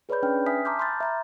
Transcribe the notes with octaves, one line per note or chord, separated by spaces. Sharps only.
G#4 B4 C#5 D5 B5 G6
C#4 D4 B4 G5 F6
E5 G#5 D#6 F6 B6
A5 A#5 C6 D6 F6 G6
B5 C6 D6 F6 G6 A6
E5 A#5 C6